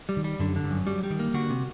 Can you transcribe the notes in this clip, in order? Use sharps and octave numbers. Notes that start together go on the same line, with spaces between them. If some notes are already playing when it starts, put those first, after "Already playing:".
G3
D#3
G3
F#2 D3
D3
G2
F#2
F#3 G3
G3
D#3
A#3
D3 F#4
C3